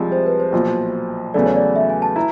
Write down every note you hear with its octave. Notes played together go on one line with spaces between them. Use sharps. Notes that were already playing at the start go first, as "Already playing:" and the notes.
Already playing: C2 C3 F3 G#3
C5
B4
C5
B1 A#2 F3
E2 C#3 F#3 A3 D5
C#5
D5
E5
G#5
A5
E4 A#5